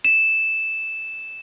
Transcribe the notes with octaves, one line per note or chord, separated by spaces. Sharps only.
E7